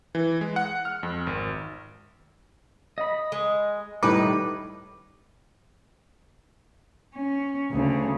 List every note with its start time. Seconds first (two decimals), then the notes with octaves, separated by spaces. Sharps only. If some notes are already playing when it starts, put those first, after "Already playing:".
0.15 E3
0.41 G#3
0.56 F#5
0.85 F6
1.03 F2
1.27 G#1
2.98 D#5 B5
3.32 G#3
4.03 A2 D#3 G3 D#4 B4 D6
7.15 C#4
7.72 D2 C#3